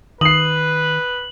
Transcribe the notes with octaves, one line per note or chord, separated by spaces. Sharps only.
D#3 B4 D#6 C7 F#7